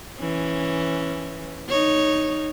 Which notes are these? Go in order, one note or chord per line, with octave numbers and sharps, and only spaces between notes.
E3 C#4
D#4 C#5